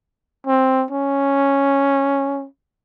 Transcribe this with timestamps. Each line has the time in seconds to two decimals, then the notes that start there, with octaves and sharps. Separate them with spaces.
0.47 C4
0.91 C#4